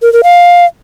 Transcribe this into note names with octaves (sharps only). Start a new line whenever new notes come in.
A#4
A#4
F5